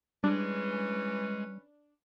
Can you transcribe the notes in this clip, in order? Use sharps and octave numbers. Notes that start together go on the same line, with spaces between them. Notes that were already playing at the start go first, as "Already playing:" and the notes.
E3 G3 G#3 C#4 D4 B4